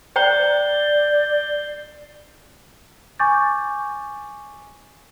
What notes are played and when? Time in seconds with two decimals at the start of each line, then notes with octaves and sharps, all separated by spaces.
0.16 C5 D5 G5 A#5 G6 C7 G7
3.19 G#5 C#6 D6 G6 A6